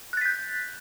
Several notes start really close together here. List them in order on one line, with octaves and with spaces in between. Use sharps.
F#6 A6 B6 G6